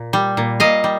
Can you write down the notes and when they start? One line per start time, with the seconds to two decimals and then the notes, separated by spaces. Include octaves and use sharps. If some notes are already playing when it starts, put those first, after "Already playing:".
Already playing: A#2
0.13 G3
0.37 A#2
0.60 A#2 D#5 F5
0.84 G3